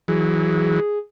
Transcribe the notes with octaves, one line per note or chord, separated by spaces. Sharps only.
E3 F#3 G#4